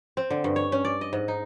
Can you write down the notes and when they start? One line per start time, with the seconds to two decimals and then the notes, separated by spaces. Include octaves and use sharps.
0.17 C4
0.30 D3
0.44 G2
0.56 C#5
0.72 C#4
0.85 D5
1.01 D#5
1.13 G#2
1.28 D#4